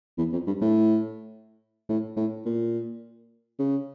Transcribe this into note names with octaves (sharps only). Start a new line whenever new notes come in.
E2
F2
G2
A2
A2
A2
A#2
C#3